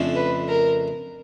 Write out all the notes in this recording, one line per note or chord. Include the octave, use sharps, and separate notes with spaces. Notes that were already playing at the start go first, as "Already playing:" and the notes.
Already playing: F2 C#3 F3 A3 D4
B4
A#4